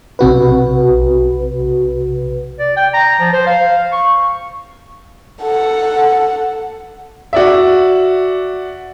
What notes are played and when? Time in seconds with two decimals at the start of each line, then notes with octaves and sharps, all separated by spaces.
0.19 B1 C3 F#4 B4
2.59 D5
2.77 G5
2.94 A#5
3.20 F3
3.33 C5
3.46 F5
3.92 C#6
5.42 A4 F#5
7.33 F#4 D5 E5